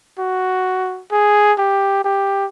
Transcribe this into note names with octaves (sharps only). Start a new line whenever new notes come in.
F#4
G#4
G4
G4